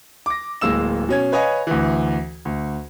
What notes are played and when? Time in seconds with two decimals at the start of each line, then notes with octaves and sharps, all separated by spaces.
0.26 D6 A#6
0.61 D1 G#3 A#3 E6 E7
1.09 B2 C#4 G#6
1.32 B4 C#5 D#5 F5 G#5
1.67 D2 E3
2.45 D2